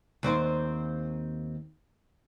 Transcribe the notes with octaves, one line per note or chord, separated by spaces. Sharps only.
D#2 C4 C5